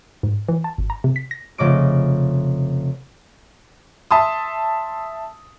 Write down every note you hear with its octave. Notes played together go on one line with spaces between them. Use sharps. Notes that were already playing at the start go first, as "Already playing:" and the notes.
G#2
E3
A5
G#1
A#5
C3
B6
A#6
F1 C#3 D#5 D6 D7
E5 A5 C6 D#6